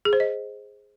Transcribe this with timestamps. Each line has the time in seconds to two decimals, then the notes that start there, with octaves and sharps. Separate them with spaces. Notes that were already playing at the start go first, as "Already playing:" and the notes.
0.05 G#4
0.13 C5
0.20 D#5